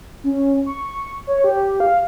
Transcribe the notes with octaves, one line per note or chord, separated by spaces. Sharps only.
C#4
C#6
C#5
G4
F5